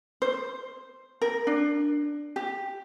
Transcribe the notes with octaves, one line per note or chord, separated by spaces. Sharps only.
C5
A#4
D4
G4